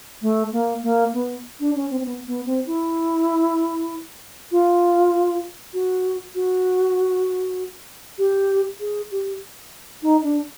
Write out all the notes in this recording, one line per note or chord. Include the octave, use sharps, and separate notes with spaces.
A3
A#3
A#3
B3
D4
C#4
C4
C4
B3
B3
C4
E4
F4
F#4
F#4
G4
G#4
G4
D#4
D4